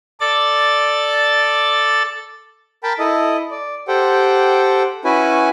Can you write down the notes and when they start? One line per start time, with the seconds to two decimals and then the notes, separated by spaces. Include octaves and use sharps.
0.20 A4 D5 A6
2.83 A#4 G5 A5 B5
2.99 E4 A4 D#5
3.51 D5
3.88 G4 A4 C5 F#5 G5
5.04 C#4 E4 F#4 B4 G#5